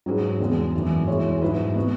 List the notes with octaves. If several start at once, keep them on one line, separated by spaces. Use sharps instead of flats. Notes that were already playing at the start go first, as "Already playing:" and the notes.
G#2 F#3 C#4 G#4 B4
E2 C#3 G#3 B3
G#1 F#2 E3
E2 B2 G#3 E4 C#5
G#2 F#3 E4 B4
B2 B3 F#4